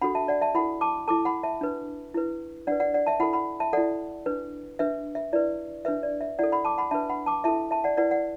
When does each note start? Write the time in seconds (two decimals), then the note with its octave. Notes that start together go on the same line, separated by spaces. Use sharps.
0.01 D4 F#4 A4 F#5 B5
0.15 E5 A5
0.28 D5 F#5
0.41 E5 A5
0.55 E4 A4 F#5 B5
0.81 A5 D6
1.08 E4 A4 A5 D6
1.25 F#5 B5
1.43 E5 A5
1.61 D4 B4
2.14 E4 B4
2.67 D4 B4 D5 F#5
2.80 D5 F#5
2.94 D5 F#5
3.06 E5 A5
3.20 E4 A4 F#5 B5
3.33 F#5 B5
3.60 E5 A5
3.73 E4 A4 D5 F#5
4.26 D4 B4
4.79 D4 B4 E5
5.15 E5
5.33 E4 B4 D5
5.85 D4 B4 E5
6.03 D5
6.21 E5
6.39 E4 A4 D5 F#5
6.52 F#5 B5
6.65 A5 D6
6.78 F#5 B5
6.91 D4 B4 E5 A5
7.09 F#5 B5
7.26 A5 D6
7.44 E4 A4 E5 A5
7.71 E5 A5
7.84 D5 F#5
7.97 E4 B4 D5 F#5
8.11 D5 F#5